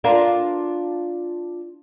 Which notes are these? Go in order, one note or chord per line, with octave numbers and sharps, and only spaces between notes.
D4 F4 A#4